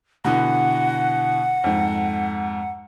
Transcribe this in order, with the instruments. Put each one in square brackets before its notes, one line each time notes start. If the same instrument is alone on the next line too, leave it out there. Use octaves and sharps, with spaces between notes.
[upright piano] B2 D3 E3 [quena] F#5
[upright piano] F2 G#2